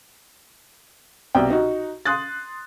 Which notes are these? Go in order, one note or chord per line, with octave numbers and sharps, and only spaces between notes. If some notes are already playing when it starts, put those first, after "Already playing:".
C2 B2 D5 G5
D#4 F#4
C6 D#6 F#6 A6